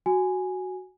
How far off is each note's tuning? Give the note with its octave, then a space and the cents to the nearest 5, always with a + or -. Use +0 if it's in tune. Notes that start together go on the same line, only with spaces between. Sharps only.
F#4 +0 G#5 +0